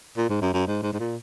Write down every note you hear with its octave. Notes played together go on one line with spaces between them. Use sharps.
A#2
G#2
F#2
F#2
G#2
G#2
G#2
A#2